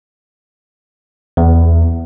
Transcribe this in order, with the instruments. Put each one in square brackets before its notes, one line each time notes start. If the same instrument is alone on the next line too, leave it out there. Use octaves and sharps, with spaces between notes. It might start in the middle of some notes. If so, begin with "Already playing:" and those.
[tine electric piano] E2